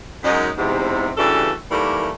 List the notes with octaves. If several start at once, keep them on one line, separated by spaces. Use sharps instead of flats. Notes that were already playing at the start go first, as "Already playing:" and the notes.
F#2 G#3 D#4
E2 G#2 C3
G2 C#3 E3 G3 F#4 A4
D#3 E3 G3 A3 A#3